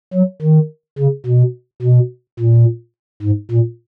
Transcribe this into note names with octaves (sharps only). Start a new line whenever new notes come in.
F#3
D#3
C#3
B2
B2
A#2
G#2
A#2